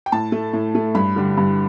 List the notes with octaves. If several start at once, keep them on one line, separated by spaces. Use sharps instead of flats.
G5
A2 A5
A3
A2
A3
G2 B5
D3 G3
G2